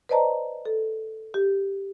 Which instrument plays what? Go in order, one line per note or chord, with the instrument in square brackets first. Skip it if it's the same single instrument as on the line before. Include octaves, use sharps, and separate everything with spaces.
[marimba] B4 C5 D5 D#5 A5 A#5
A4
G4